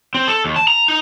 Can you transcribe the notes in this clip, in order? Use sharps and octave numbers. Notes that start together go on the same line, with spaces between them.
C4
A4
D#2
A5
A#5
D#4